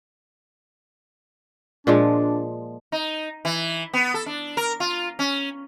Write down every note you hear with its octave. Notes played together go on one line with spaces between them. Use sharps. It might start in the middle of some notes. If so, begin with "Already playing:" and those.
A#2 F3 G#3 D4
D#4
E3
B3
A4
D4
A#4
F4
C#4